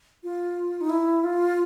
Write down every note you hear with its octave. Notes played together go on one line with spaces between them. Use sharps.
F4
D#4
E4
F4